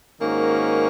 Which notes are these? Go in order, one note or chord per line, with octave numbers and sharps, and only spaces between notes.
G#2 D#3 A#3 C#4 F#4